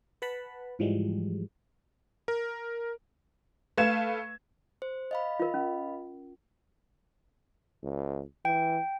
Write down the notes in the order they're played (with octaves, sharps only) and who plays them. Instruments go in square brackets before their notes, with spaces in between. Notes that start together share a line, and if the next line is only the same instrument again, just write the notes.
[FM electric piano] B4 F#5 A5 B5
G#2 E3 F3 G3 G#3
[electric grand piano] A#4
[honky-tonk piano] A3 B4 F5 G#6 E7
[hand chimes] C5
D#5 F5 B5
[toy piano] F4 A#4
C#4
[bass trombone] C#2
[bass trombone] E3 [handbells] G5